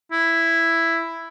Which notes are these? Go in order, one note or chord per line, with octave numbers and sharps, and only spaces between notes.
E4